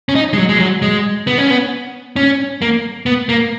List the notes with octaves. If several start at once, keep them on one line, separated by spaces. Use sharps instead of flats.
C#4
D#4
G#3
F#3
G#3
F#3
G#3
B3
C#4
B3
C#4
A#3
B3
A#3